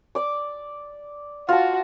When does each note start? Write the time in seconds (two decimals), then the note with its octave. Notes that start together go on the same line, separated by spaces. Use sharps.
0.15 D5 D6
1.49 F4 F#4 A5